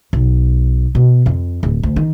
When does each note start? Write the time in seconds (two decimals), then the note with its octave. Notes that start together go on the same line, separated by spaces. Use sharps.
0.13 B1
0.95 B2
1.26 F2
1.63 D1
1.83 D2
1.96 D#3